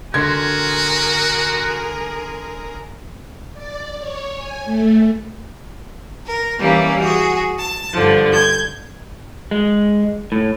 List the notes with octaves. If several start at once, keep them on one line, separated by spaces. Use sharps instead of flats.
D3 F#4 G#4 A#4 C6 G#6
D5
C#5
G#5
A3
A#4
E3 G3 A#3 C#4
F#4 G#4
A5
G2 D3 F3
G6 G#6
G#3
A2